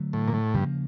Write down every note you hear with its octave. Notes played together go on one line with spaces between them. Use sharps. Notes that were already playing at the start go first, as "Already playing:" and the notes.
Already playing: D3 F#3 A3
A2
A#2
A2
G2 C#3 F3 A#3